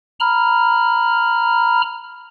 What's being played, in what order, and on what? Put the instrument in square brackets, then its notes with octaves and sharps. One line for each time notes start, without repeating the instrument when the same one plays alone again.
[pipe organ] A#5 B5 F6